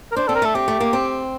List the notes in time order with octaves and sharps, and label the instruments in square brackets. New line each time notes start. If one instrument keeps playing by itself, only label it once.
[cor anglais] A#4
[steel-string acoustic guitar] D4 [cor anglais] C5
[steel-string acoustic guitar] C4 [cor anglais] A4
[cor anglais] A#4
[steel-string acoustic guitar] A3 [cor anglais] A4
[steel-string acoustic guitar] C4 [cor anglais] G4
[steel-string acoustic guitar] A3
A#3
C4